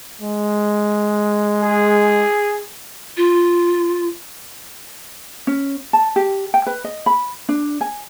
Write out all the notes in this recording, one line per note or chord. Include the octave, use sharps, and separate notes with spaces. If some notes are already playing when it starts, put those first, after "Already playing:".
G#3
G#4
F4
C#4
A5
G4
G5
B4
D#5
B5
D4
G#5